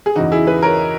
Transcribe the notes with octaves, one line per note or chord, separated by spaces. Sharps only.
G#4
E2 C#3 E3 D#4 F#4
E4 G#4
G#4 B4
A#4 C#5